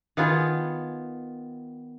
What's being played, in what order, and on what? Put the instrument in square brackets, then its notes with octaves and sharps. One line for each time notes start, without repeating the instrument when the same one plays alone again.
[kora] D#3 B3 F4 G#4